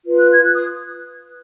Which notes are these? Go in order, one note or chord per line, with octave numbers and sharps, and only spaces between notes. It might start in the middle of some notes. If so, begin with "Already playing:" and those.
F4 B4
F#6
G#6
F#6
D#6